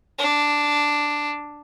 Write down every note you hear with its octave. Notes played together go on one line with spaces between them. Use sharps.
D4